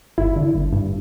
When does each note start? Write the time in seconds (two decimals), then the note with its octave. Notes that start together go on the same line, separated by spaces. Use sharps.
0.18 G1 E4
0.36 D3
0.55 G1
0.72 G2